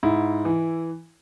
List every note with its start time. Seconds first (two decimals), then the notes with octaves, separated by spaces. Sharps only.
0.03 G#2 E4
0.45 E3